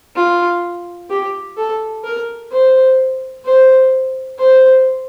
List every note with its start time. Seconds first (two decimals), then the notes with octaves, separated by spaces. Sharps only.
0.16 F4
1.10 G4
1.57 A4
2.04 A#4
2.52 C5
3.45 C5
4.39 C5